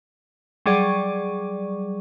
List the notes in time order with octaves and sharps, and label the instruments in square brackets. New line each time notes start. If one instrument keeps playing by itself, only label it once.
[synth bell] F#3 G3 G#4 D5 C#6